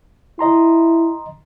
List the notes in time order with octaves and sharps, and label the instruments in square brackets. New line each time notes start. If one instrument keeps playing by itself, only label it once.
[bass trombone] E4 [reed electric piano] D#5 A#5 C6